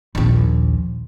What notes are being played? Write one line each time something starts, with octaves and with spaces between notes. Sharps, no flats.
A#1 D#2